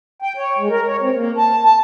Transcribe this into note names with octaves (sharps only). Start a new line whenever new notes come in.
G5
C#5
G#3
A#4
C#5
C4
A#3
A5
A5